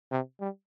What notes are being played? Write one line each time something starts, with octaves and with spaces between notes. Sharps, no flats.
C3
G3